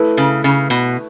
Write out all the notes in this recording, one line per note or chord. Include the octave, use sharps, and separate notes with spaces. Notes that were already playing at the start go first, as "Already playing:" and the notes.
Already playing: A3 E4 B4
C#3
C#3
B2